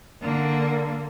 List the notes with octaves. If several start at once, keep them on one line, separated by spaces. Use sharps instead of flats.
D3 A#3